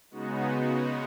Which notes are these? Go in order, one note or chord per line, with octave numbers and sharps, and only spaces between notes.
C#3 G#3 B3 D#4 F#4